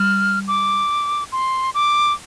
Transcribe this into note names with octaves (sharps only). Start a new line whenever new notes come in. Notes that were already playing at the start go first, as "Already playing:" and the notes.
Already playing: G3 F6
D6
C6
D6